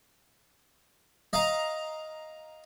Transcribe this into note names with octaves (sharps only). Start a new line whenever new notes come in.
D#5 F5 A#5